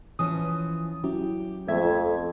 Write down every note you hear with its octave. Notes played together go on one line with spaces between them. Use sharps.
E3 F3 C#4 D#6
F#3 C#4 E4 G4
F2 A3 E5 G#6